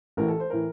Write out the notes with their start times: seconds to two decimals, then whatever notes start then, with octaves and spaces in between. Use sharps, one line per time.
0.17 A1 A2 E3 A#4
0.28 A4
0.40 C5
0.50 A2 E3 A#4